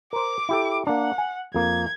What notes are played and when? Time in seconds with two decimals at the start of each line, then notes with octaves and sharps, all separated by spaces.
0.13 A#4 C5 D6
0.49 E4 G4 A4
0.87 A#3 D4 F#5
1.18 G#5
1.54 F2 A#3 G#6